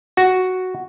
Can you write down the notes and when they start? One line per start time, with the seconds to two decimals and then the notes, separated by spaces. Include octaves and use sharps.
0.17 F#4